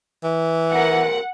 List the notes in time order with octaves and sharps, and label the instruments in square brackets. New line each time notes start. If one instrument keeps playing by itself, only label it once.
[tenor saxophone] E3
[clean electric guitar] B1 A#4 [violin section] F#5